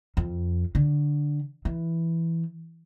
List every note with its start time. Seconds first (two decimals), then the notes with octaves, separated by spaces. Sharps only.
0.17 F2
0.75 D3
1.65 E3